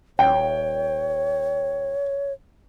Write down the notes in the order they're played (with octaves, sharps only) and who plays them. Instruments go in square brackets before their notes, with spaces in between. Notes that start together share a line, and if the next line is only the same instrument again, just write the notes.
[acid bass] D#1 [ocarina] C#5 [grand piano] G5